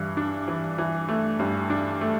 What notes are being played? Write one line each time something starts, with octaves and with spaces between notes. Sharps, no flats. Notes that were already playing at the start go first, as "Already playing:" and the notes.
Already playing: G2 E3
D4
E3
E3
A3
G2
D4
A3